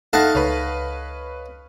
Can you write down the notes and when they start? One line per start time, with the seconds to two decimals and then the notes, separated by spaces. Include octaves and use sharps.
0.13 A3 D#4 A4 D#5 F5 F#5 A5 A#6
0.35 C#2 B4 C#5